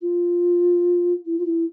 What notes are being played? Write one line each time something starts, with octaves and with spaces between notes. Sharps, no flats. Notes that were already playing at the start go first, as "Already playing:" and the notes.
F4
E4
F4
E4